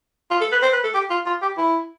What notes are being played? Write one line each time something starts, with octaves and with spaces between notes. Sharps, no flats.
F4
A4
B4
C5
B4
A4
G4
F4
F4
G4
E4